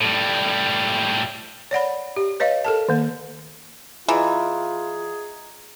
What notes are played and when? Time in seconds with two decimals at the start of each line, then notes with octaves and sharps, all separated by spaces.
0.01 A2 G3
1.71 C#5 D5 F#5 B5
2.16 G4
2.40 B4 C#5 D#5 F5
2.64 A4 A#4 A5
2.89 D#3 A#3
4.08 E3 F4 G#4 D#5 A#5